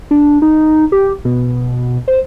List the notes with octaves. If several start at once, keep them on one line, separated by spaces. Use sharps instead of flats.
D4
D#4
G4
B2
C5